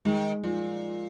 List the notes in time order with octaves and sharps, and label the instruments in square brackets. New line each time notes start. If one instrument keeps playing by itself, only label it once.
[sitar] D#3 [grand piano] G#3
[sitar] A#2 [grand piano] F3